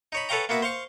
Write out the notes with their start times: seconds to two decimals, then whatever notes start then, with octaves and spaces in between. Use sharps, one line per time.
0.12 D#4 C#5 B5
0.29 A4 B4 C#5 F5 G5 A#5
0.49 A#3 B3 F#4 E5
0.62 C5 F5 C#6